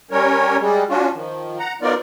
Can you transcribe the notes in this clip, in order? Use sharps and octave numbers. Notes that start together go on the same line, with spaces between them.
G3 C#4 A#4 C#5
G3 G#3
C#4 D4 F4 F#4
D#3 F3
F#5 A#5
F#3 B3 D#4 F4 A#4 D5